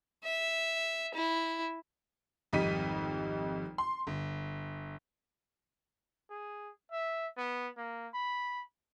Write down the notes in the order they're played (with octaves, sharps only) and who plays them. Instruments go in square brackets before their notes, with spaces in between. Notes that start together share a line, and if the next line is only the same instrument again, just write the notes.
[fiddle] E5
E4
[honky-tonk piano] G#1 F2 G3 D#4 B6 D#7
C6
G1
[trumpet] G#4
E5
B3
A#3
B5